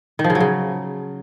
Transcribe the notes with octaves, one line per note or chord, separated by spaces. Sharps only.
D#3
F3
C#3
F#3
C#3